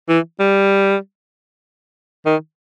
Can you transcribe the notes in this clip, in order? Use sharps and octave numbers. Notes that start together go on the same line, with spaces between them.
E3
G3
D#3